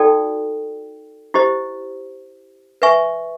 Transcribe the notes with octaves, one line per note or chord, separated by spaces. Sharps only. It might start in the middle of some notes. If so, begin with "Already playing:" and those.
Already playing: D#4 F#4 A4 D5 G5
E4 G4 C5 D#5
B4 E5 G#5 C#6